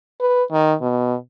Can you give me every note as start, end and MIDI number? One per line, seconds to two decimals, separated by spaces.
0.21 0.43 71
0.52 0.74 51
0.82 1.15 47